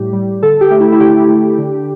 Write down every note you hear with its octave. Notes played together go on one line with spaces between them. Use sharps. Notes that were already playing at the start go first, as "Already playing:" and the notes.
Already playing: A2 G3 G4
G3
D3 A4
G4
A3
E4
E4
D3 G4
A3
D3